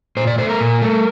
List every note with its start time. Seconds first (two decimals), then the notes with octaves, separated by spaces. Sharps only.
0.17 A#2 C5
0.27 D5
0.38 A3 C5
0.49 A#4
0.60 A#2
0.82 A3